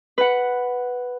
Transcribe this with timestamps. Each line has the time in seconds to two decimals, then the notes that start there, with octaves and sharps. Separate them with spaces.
0.18 B4 F#5